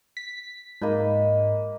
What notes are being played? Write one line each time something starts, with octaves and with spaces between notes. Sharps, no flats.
B6
G#2 A#3 D#5 B5